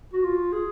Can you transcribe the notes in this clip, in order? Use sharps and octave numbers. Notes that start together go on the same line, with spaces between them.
F#4
F4
G#4